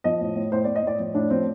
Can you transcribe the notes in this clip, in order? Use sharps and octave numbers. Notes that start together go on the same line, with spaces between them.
F3 D#5
A2
A2
A2 C5
A2 D5
D#5
A2 D5
F3
A2 D4
F3 C4